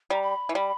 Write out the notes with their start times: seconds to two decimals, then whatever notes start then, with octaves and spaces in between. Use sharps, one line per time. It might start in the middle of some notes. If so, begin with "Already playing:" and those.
0.10 G3 A#5
0.22 B5
0.49 E3
0.54 G3 B5